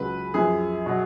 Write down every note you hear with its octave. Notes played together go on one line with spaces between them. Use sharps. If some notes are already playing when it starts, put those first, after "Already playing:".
Already playing: C#2 C#3 F#3 B4
F#2 F3 G#4
B2 F#3